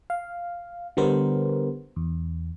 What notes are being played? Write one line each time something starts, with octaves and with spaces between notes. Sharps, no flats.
F5
D3 G3 B3 A#4 C5
E2